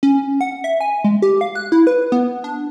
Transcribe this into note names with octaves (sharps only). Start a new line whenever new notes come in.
C#4
F#5
E5
G#5
G#3
G4
F5
F#6
E4
B4
B3
D4